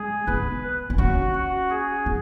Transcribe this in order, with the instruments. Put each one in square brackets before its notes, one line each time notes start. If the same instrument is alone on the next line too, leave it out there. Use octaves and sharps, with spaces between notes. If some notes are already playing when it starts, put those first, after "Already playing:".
Already playing: [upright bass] G#3 [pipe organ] G#4
[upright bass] B3 [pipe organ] B4
[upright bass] B3
[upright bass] C#4 [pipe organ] F#4
[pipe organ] F#4
G#4
[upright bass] B3